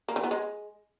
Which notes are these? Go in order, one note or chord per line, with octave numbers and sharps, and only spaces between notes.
A#3
E3
B3
G#3